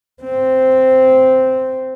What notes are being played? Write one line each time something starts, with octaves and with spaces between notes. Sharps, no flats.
C4